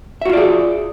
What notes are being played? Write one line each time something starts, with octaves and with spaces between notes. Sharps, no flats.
F4 F#4 G#4 D5 E5